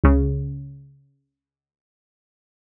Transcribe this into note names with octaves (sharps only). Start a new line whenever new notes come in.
C#2 C#3